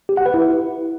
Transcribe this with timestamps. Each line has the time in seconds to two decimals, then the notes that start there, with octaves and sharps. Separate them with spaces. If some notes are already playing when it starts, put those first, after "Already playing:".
0.09 G4
0.17 F#5
0.26 B4
0.34 E4